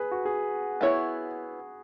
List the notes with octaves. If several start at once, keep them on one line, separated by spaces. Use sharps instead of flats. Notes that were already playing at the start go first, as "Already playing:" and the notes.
Already playing: G#4 B4
F#4
G#4
B3 E4 C#5